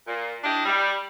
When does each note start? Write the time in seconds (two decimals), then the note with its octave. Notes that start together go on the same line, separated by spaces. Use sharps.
0.07 A#2
0.44 D4 E4 G4 D#5
0.66 G3